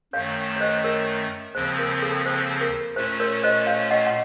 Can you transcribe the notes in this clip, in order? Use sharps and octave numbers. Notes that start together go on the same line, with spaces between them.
F#2 D#3 A3 C#5 F5
C#5
C5 D#5
A#4 C#5
D#2 C#3 F3 C4 C5
A#4
A4
C5
A#4
A#2 A3 C#4 C5
A#4 C#5
C5 D#5
C#5 F5
D#5 F#5
F#5